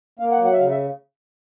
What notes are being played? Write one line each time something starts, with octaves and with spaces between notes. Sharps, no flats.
A#3 F5
F#5
F#3
F#5
E5
C#3 F5
E5